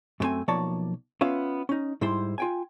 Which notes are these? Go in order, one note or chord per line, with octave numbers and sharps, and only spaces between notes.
F#2 C3 A3 C4 G#5
B1 F3 A#3 C#5 D5 A5
B3 C#4 F4 E5 F5
C#4 D#4
G#2 G3 E4 C5 C6
F4 G5 G#5